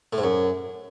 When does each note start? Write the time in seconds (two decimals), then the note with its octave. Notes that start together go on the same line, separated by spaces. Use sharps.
0.13 A2
0.18 G#2
0.23 F#2